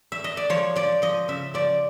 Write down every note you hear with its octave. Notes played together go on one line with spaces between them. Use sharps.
E5
D#5
D5
F3 C#5
F3 D5
F3 D#5
C#3 E5
F3 D5